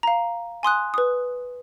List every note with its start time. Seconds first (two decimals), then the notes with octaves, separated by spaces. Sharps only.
0.03 F5 A#5
0.63 G#5 C6 D#6 F#6
0.94 B4 D#6